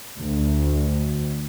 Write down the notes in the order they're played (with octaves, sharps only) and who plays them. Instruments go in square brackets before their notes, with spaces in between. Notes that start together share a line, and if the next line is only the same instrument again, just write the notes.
[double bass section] D2